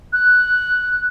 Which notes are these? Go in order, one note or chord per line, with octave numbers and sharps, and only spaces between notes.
F#6